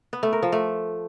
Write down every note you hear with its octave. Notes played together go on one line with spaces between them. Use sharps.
B3
A3
A#4
F3
A3